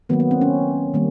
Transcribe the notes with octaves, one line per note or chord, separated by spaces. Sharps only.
D#3 F#3 A#3 B3
B3
C4
C#4
D#3 G3 A#3